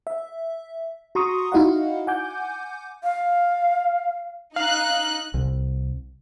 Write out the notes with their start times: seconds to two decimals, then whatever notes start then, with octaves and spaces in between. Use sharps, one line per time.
0.07 E5
1.15 F#4 A#5 C6 C#6 D#6
1.52 D#4 E4 F#4 D#5 F5 F#5
2.07 F#5 G#5 D6 G6
3.04 F5
4.56 D#4 F5 F#6
5.34 C2